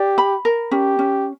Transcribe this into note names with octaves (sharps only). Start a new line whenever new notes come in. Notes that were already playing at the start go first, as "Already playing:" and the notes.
Already playing: G4 D5
B5
A#4
C#4 G4
C#4